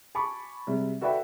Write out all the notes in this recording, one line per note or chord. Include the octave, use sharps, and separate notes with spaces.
G#5 A5 B5 C#6 D6
C3 G3 G#3
F#4 A4 B4 D5 E5 G5